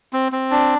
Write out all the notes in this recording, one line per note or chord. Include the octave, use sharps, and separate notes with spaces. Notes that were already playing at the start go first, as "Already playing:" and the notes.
C4
C4
D4